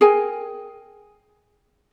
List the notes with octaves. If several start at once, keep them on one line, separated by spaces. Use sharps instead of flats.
G#4 A#4 G5 G#5